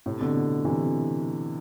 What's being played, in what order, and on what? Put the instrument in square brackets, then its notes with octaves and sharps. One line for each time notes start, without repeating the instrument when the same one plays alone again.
[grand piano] A2 C3
B2 D3
C3 E3